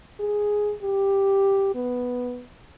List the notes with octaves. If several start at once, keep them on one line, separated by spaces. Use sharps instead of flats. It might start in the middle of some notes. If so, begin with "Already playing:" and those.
G#4
G4
B3